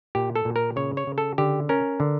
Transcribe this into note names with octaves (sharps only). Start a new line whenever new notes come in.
A#2 G4
A4
A#2
A#4
C#3 C#5
C#5
C#3
A4
D3 G4
C#4 A#4
D3